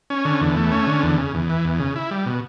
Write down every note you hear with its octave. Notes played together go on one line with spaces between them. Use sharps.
C#4
D3
E2
A3
C#4
D3
E2
C#3
E2
E3
E2
C#3
E4
G3
B2